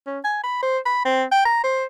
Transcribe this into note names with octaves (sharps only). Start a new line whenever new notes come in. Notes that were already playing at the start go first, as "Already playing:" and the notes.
C#4
G#5
B5
C5
B5
C4
G5
A#5
C5